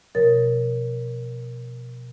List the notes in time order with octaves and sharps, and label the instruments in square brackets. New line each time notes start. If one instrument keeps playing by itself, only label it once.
[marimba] B2 F3 A#4 C#5 A6